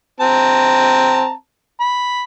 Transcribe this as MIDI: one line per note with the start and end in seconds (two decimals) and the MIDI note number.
0.20 1.32 60
0.20 1.32 81
0.20 1.32 82
1.80 2.23 83